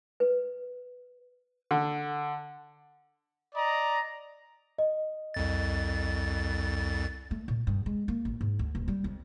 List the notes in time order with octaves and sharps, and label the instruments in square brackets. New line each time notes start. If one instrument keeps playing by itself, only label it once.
[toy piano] B4
[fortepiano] D3
[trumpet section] D5 D#5 A#5
[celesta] D#5
[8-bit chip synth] C2 F2 A6
[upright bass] A3
A#2
G2
G#3
A#3
A1
G#2
D2
D#1
G3
F2